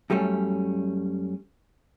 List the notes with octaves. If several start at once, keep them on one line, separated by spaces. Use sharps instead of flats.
F#2 G3 A3 C#4